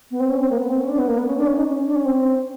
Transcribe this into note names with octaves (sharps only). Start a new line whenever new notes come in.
B3
C4
C#4
C4
A#3
B3
C4
C#4
D4
B3
A#3
B3
C#4
D4
C#4
D#4
C#4
D4
C#4
C4